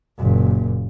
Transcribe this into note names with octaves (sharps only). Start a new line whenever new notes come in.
F#1 A#2